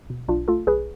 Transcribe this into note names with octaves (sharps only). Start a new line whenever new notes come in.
B2
B1 D4 F4
A3 F4 A4
B1 G#4 B4